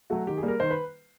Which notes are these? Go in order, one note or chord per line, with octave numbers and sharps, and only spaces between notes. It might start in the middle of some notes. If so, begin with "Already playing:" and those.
F#3 A3 F#4
D#3 G4
G#4
G3 A#3
A#4
D#3 C5
B4